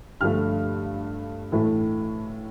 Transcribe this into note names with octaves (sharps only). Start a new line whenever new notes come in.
G2 D3 F3 A3 F6
A2 E3 A3